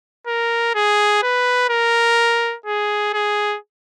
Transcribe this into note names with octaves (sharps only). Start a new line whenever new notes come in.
A#4
G#4
B4
A#4
G#4
G#4